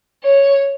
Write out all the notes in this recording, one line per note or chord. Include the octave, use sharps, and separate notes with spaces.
C#5